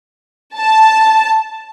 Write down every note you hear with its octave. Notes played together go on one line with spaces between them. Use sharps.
A5